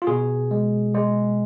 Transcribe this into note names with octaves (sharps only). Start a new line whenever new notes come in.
F4
B2 G#4
G#3
G#3